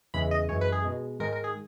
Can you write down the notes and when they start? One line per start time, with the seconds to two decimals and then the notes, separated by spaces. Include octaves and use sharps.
0.14 E2 C#3 E3 G#3 B5
0.31 D#5
0.49 F#2 E3 G#3 C#5
0.61 B4
0.72 G#4
0.84 B2 G#3
1.20 G#2 D#3 G#3 A#4
1.33 A#4
1.44 G#4